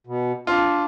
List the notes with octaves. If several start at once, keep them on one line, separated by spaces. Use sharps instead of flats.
B2
D4 F4